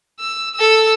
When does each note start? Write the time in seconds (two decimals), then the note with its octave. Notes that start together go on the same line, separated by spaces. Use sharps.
0.20 E6
0.55 A4 E6